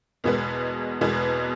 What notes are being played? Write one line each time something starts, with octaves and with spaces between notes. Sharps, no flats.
E2 B2 G#3 B3
E2 B2 G#3 B3